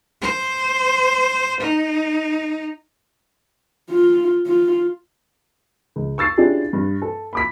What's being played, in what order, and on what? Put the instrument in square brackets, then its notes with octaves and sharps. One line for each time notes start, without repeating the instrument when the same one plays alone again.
[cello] C5
D#4
[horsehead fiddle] F4
F4
[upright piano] C#2
C#6 E6 A6 C7
C#4 D4 E4 F4 G4 G#4
G2
A4
B5 D6 B6